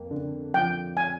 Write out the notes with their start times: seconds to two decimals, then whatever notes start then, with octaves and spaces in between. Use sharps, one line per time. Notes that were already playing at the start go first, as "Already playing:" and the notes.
Already playing: F2 A#3
0.11 D3
0.54 F3 G5
0.97 G#5